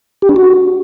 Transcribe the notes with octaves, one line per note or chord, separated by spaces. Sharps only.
G4
D4
F#4